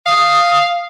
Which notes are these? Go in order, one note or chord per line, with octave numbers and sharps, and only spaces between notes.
F5 D#6